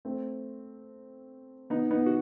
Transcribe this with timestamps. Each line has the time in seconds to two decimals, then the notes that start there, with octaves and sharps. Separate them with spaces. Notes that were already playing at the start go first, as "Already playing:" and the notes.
0.05 A3 C4
1.70 B3 D#4
1.91 B3 D#4
2.06 F#4